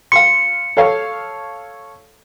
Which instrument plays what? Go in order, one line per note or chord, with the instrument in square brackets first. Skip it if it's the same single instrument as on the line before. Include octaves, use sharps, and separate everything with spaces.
[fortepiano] F5 C6 [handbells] C#7
[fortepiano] A4 C#5 F5